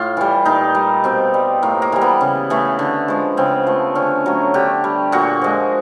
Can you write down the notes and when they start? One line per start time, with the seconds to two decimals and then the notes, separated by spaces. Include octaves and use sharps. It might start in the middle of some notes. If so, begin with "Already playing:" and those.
Already playing: A2 F4
0.17 E3 G3
0.45 A#2 D#4
0.75 G3
1.04 B2 C4
1.34 G3
1.63 A2 A#3
1.82 A#3
1.92 E3 G3
2.01 B3
2.21 C#3
2.50 E3 A3
2.79 D3
3.08 F3 G#3
3.37 C#3 C4
3.67 F3 A3
3.95 D3 C#4
4.26 F#3 A3
4.54 D3 G4
4.84 G3
5.12 A#2 F#4
5.42 F3 G#3